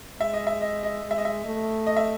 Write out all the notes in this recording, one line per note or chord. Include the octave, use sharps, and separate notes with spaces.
G#3 E5
D#5
E5
D#5
D#5
G#3
E5
D#5
E5
A3
D#5
E5